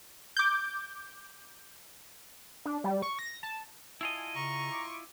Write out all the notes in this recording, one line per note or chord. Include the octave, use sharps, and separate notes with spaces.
D6 G6
D4
G3
C#6
A#6
A5
E4 F4 D#5 G#5 A5
C#3 A#5 C#6
B5 C6 D6